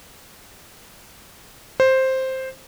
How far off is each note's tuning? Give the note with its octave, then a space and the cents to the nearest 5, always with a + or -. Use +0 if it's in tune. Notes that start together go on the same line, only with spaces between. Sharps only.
C5 +5